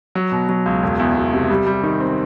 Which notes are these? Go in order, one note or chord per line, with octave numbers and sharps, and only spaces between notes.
F#3
B2
F#3
C#2
E1
E2
E1
C3
G3
G3
D#3
C4